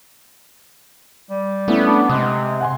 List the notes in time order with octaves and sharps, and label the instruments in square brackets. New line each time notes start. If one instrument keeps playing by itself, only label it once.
[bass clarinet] G3
[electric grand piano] A3 C#4 E4 [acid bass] B3
[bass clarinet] D4
[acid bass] C3 [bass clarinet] G#3 [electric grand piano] D#6 F#6
[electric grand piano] F#5 G#5 C6